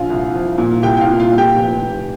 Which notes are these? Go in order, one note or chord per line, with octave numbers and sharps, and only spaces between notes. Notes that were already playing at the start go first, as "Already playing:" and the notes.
Already playing: A#1 F4 F5
C2
F3
A#2
C2 G4 G5
G5
F4 F5
A#2
F4 F5
A#2
G4 G5
F1
F1